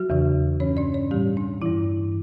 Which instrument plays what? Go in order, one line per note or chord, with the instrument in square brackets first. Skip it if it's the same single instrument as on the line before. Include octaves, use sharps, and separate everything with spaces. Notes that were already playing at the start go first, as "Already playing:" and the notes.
Already playing: [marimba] F#3 F#4
E2 C#3 E3
G2 E3 C#4 C#5
D4 D5
C#4 C#5
A2 E3 G3 G4
D4
G2 E3 E4